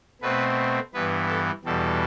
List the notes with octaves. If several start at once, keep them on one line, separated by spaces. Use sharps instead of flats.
B2 A3 C4 B4
G2 E3 B3 B4
A4
E2 B2 G3 A4